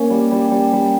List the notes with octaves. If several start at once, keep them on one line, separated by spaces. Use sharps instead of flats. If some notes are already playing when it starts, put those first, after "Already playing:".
Already playing: A#3 C#4
G3
G3
G3
G3